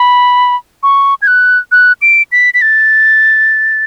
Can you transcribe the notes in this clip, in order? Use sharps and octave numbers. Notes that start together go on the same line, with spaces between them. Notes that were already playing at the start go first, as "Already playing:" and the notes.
Already playing: B5
C#6
G#6
F#6
F#6
D7
B6
B6
A6